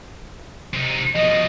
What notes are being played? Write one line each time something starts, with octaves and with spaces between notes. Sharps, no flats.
C3 D#4
B2 F3 D#5